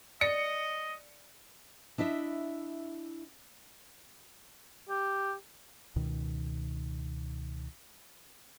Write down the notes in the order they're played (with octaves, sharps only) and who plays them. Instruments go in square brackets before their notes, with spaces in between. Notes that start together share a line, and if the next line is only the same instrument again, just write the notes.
[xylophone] D5 [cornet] D#5 [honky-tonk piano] C#7
[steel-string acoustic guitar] D4 E4 D#5 E5
[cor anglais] G4
[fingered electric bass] C#2 B2 D#3